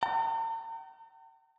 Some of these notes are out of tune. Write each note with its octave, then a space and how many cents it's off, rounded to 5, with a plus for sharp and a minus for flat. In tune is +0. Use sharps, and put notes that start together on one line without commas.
G5 -40 A#5 -45